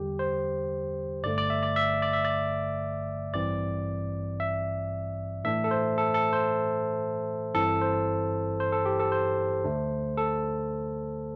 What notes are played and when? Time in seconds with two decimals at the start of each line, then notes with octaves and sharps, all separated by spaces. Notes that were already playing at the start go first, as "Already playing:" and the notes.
Already playing: E2 D3 G3 G4
0.19 C5
1.23 G1 G2 D3 A3 D5
1.38 D5
1.50 E5
1.63 D5
1.76 E5
2.02 D5
2.13 E5
2.25 D5
3.34 A1 G2 E3 C4 D5
4.40 E5
5.44 A2 E3 A3 D4 E5
5.64 A4
5.71 C5
5.98 A4
6.14 A4
6.33 C5
7.54 G1 G2 E3 C4 E4 A4
7.81 C5
8.60 C5
8.72 A4
8.85 G4
9.00 A4
9.12 C5
9.64 D2 D3 A3 D4
10.17 A4